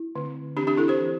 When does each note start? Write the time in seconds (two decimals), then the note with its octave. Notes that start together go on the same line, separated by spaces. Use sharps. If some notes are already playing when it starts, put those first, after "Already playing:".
Already playing: E4
0.15 D3 A3 C4
0.57 E3 C4 D4 G4
0.67 D4 G4
0.77 E4 A4
0.88 G4 C5
0.98 E3 C4